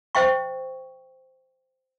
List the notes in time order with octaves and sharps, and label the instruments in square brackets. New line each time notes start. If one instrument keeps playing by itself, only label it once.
[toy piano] C5 E5 G5 C#6